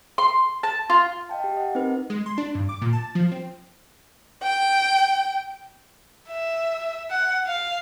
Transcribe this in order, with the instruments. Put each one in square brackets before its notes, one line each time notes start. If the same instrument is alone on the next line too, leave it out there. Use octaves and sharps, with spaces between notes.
[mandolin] C6
A5
F4
[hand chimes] D#5 F5 G5 A5
G4
D#5 F#5
C4 D#4 A#4 B4
[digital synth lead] G#3
C6
D4
G2
D6
A#2
A5
F3
C4
[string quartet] G5
[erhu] E5
F#5
F5